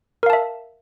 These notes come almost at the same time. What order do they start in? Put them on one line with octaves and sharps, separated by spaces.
A#4 F5 A5 E5